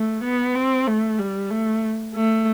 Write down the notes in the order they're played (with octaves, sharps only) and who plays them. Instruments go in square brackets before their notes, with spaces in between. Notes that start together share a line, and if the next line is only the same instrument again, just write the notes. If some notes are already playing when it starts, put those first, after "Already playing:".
Already playing: [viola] A3
B3
C4
A3
G3
A3
A3